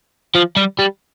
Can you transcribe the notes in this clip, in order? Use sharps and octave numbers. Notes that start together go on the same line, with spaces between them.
F3
G3
G3